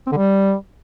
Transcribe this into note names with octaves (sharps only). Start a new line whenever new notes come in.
C4
D3
G3